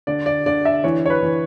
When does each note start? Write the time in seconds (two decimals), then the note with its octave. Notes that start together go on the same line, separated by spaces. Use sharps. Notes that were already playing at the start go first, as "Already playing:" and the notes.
0.07 D3 D5
0.26 D5
0.46 D3 D5
0.65 E5
0.84 E3 C#5
1.06 C#5
1.10 B4
1.22 E3